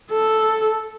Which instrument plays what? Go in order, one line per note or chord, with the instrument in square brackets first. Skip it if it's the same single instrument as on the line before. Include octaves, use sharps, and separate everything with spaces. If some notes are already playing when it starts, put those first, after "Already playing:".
[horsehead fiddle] A4